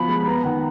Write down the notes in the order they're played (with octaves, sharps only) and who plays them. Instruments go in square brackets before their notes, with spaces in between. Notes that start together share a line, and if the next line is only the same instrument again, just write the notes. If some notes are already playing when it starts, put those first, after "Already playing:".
Already playing: [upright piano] F3 B3 F#4 [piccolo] B5
[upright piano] G#3
[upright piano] B3 [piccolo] A#5
[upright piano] D#3 [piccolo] F#5